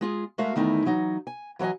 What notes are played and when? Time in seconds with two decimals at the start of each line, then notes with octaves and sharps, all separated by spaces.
0.01 G#3 F4 G#4
0.38 G#3 A3 F#4 A#4 E5 F5
0.56 E2 D#3 A3 D#4 E4 G#5
0.85 E3 F#3 D#4
1.27 G#5
1.59 E3 F#3 C#5 D#5 G#5